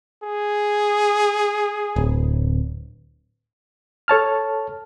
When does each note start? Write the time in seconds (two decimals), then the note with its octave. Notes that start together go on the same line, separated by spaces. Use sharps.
0.23 G#4
1.96 D1
4.08 A4 C#5 A5 F6